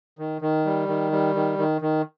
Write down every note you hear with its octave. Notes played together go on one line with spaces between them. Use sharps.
D#3
D#3
G3
D#3
G3
D#3
D#3
D#3